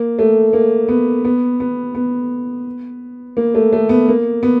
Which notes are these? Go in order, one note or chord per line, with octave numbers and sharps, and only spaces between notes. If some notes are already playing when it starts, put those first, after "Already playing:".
Already playing: A#3
A3
A#3
B3
B3
B3
B3
A#3
A3
A3
B3
A#3
B3